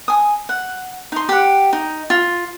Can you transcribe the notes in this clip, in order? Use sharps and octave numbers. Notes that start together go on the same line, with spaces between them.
G#5 D#6
F#5
D#4 C6
G4 F#5
D#4
F4